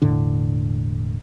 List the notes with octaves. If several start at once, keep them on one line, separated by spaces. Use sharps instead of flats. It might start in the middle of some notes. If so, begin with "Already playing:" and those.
E1 A2 D3 D4